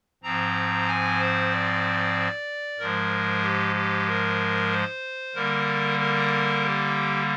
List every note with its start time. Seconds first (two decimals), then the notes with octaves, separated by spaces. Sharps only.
0.23 G#2 F3 C4 A#5
0.88 G#5
1.19 C5
1.51 D5
2.79 G#2 F3 G#3 A#4
3.43 G4
3.75 G4
4.07 A#4
4.71 C5
5.35 D3 G3 A#3 A#4
5.99 A#4
6.63 G4